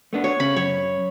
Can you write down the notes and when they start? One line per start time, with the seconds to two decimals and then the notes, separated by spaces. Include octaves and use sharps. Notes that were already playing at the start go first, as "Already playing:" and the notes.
0.13 A3 B3 D4
0.24 C#5
0.40 C#3 B5
0.56 F#2 C#5